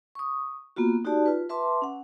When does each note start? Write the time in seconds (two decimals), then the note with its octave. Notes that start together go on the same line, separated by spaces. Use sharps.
0.15 C#6 D#6
0.76 A#3 B3 F4 F#4
1.05 D#4 F#4 G4 D5 A5
1.26 F4 B4
1.49 B4 E5 A5 C6 D6
1.82 C#4 F#5